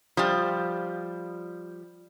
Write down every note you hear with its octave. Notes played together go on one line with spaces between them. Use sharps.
F3 G3